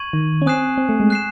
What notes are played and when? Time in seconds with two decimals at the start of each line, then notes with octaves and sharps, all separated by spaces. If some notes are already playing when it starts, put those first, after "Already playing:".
Already playing: C#6 G#6 D#7 F#7
0.13 D#3
0.42 C#4
0.46 C4 G#5 D#6 F#6 C7 E7
0.78 C4
0.89 A3
1.00 G#3
1.10 F#6 C7 E7